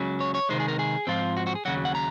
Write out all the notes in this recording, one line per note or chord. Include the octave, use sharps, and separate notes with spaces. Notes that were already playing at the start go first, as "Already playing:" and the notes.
Already playing: C#2 C#3 F#3
C#5
C#5
C3 D#3 G#3 C5
G#4
A#4
G#4
G#2 F3 C4 F4
F#4
F#4
G#4
D#2 C#3 F#3 F#4
F#5
A#5